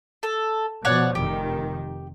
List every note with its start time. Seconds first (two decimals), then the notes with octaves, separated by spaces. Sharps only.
0.23 A4
0.85 B2 F3 C#5 D5 F#5
1.15 F1 D#3 G4